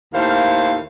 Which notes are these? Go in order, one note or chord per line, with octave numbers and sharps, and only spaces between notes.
D#2 A2 C5 F5